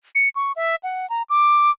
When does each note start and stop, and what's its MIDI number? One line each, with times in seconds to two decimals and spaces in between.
0.15 0.29 97
0.36 0.52 85
0.56 0.76 76
0.83 1.08 78
1.10 1.22 82
1.30 1.71 86